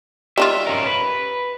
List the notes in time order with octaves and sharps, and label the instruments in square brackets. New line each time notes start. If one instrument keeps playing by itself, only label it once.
[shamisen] G3 D#4 F4 [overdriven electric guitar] E5
[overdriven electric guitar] C#4 A#4
B4